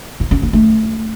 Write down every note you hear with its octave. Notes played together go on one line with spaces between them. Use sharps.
E4
C#4
A#3
A3